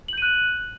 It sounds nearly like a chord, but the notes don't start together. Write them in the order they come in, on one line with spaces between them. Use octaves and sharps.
F#7 G6 D#7 F#6